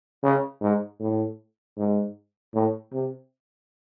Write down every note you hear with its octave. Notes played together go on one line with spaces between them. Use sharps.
C#3
G#2
A2
G#2
A2
C3